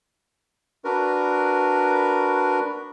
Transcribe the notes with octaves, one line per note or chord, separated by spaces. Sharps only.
D4 F#4 A#4 B4